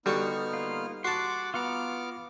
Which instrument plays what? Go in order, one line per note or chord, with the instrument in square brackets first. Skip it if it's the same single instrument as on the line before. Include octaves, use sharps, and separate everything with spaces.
[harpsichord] D3 F#4 C#6 [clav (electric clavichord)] G3 [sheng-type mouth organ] B3 D#4 F6
[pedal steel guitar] A#3 F4
[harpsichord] F#4 A5 [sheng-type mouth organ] F#5 D6 [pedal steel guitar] C6
[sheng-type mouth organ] B3 D6 F6 [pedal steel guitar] F4 F#5 A#5